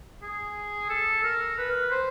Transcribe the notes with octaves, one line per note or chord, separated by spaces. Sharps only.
G#4
A4
A#4
B4
C5